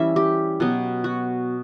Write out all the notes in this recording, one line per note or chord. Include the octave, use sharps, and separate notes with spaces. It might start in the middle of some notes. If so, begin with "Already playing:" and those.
Already playing: E3 G3 C#4 E5
G4
B2 F#3 B3
F#4